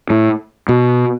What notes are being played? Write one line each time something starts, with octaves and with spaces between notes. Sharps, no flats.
A2
B2